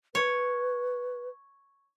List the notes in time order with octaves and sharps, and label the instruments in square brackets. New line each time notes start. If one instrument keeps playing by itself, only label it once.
[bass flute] B4 [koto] C#5